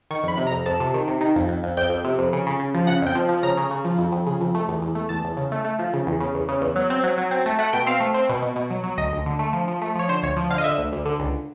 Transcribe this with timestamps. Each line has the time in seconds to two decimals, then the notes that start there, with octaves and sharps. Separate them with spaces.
0.11 D#3 C#6
0.24 F2 B5
0.37 C3
0.47 A#5
0.51 F2
0.66 F2 A5
0.80 C3
0.94 D#3
1.07 C3
1.21 D#3
1.36 F2
1.48 F2
1.63 F2
1.77 F2 G5
1.90 F2
2.04 C3
2.19 F2
2.33 C#3
2.46 C#3
2.59 C#3
2.74 F3
2.87 C#3 F#5
3.02 F2 G5
3.15 F3
3.29 F3
3.43 C#3 A#5
3.57 C#3
3.71 C#3
3.85 F3
3.99 F2
4.12 F2
4.27 C#3
4.41 F2
4.55 A3
4.68 E2
4.82 E2
4.95 A3
5.09 E2 A5
5.24 E2
5.37 C#3
5.52 A3
5.64 A3
5.79 F3
5.93 C#3
6.07 E2
6.20 C#3
6.34 E2
6.49 C#3
6.62 E2
6.76 F#3
6.90 C4
7.03 F#3
7.17 F#3
7.31 C4
7.46 A3
7.59 A3 F#5
7.73 B2 G5
7.87 C4 F5
8.00 A3
8.14 C4
8.29 B2
8.42 B2
8.56 B2
8.70 F#3
8.84 F#3
8.97 D2 D#5
9.12 D2
9.26 D3
9.39 A3
9.53 F3
9.68 F3
9.82 A3
9.95 F3 C#5
10.09 D3 C5
10.23 D2 C#5
10.37 F3
10.50 D3 F5
10.58 D#5
10.64 D3 E5
10.78 D2
10.92 D2
11.05 D3
11.19 C#2